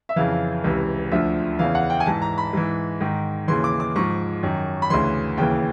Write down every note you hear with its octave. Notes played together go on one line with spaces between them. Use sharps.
E5
F2 C#3 E3 F5
C#2 C3 E3
D2 D3 F3 E5
E2 C#3 E3 F5
F#5
G5
G#5
G#2 E3 A5
A#5
B5
G#2 E3
G#2 D#3
D#2 C#3 E3 C6
D6
D6
G#2 F3 C#6
F#2 D#3
B5
D2 C#3 E3 C6
D#2 C#3 E3 G5